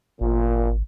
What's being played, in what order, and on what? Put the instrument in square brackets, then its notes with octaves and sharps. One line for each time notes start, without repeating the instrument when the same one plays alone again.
[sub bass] G#1 [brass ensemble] A#2